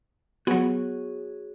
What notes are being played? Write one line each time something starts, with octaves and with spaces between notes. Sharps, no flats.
F#3 B3 F#4 G#4 C#5